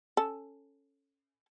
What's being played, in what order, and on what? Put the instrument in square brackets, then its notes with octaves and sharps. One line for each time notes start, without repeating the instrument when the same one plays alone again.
[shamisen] C#4 A4